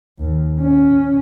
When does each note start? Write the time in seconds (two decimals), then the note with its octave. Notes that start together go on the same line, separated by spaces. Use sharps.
0.19 D#2
0.61 C#4